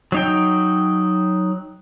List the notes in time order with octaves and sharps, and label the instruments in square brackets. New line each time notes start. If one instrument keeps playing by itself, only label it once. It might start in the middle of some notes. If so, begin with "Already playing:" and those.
[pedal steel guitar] F#3 D#4 G5